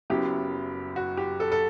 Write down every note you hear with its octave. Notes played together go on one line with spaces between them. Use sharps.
F#1 F#2 F#3 B3 E4 G4
F#4
G4
A4
A4